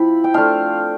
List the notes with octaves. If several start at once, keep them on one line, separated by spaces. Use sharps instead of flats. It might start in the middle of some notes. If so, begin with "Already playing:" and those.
Already playing: F3 C4 E4 B5
G5
A3 D4 F4 F5 A5